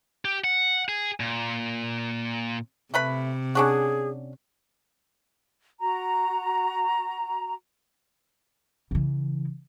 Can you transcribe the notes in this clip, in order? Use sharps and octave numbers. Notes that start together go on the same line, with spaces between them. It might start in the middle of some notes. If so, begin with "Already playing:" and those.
G4
F#5
G#4
A#2
C3 A3 B4 B5
C#4 D4 F#4 G#4
F#4 A#5
C#3 E3